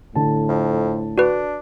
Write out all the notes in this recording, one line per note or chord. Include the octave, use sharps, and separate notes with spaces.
A2 D3 A5
F2
D4 F#4 B4